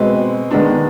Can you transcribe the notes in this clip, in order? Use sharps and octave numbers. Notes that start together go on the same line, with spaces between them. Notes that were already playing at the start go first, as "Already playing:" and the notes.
Already playing: B2 G#3 C4 B4
D#3 G#3 B3 D4